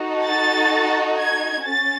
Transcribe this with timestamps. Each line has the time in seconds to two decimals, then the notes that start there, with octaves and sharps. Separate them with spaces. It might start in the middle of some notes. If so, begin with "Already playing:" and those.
Already playing: D#4 F#4 A4
0.25 A6
1.20 G#6
1.66 C#4 A6